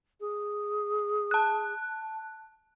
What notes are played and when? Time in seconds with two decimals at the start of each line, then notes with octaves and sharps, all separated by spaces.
0.20 G#4
1.31 A5 F#6